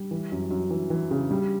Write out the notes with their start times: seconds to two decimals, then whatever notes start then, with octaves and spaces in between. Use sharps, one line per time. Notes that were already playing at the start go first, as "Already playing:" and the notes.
Already playing: G3
0.11 E3
0.32 F#2
0.51 F#2
0.71 E3
0.90 E3
1.11 C#3
1.31 G3